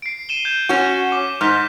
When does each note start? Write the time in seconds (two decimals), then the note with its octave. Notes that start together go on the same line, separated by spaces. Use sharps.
0.02 C7 D7
0.29 D#7 E7 G7
0.45 G6 G#6 E7
0.69 C#4 F#4
1.12 D6 E7
1.41 G#2 F6 G6 B6